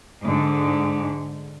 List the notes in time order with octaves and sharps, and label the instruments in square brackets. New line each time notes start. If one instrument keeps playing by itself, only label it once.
[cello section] G#2 D3